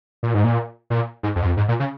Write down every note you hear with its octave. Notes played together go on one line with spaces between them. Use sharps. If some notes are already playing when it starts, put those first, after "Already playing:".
A#2
G#2
A#2
A#2
G#2
F2
G#2
F2
G#2
A#2
C#3